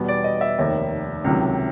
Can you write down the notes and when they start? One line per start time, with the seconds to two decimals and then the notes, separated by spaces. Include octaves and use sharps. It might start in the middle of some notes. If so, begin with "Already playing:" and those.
Already playing: E2 B2 G3 B3
0.08 D5
0.24 D#5
0.41 E5
0.58 F1 D#2 D#3
1.24 C#2 C3 D#3 F#3